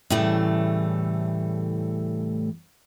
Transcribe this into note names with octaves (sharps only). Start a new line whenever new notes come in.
A2 C#3 E3 G3 A3